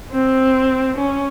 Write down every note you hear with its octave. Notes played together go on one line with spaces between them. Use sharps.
C4
C#4